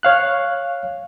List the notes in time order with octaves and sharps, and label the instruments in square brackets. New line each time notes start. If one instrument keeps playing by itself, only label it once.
[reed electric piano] C#5 F5 F#6